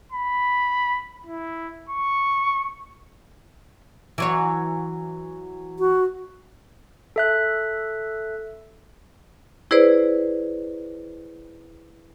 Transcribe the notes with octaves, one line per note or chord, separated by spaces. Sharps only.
B5
E4
C#6
E3 F#3 C#5
F#4
A4 E5 F#6
E4 G#4 B4 C5 D5